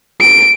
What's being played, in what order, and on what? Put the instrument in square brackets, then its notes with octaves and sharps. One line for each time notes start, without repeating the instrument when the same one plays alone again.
[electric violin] D7